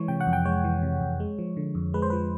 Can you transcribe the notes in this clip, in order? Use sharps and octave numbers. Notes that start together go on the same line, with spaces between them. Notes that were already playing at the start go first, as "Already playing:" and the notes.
Already playing: E3 G#3 C#5
C3 G5
F#5
F2
G5
G#3 C#5
E3
C3
F2
G#3
F3
D3
F2
G#3 B4
C5
F3 B4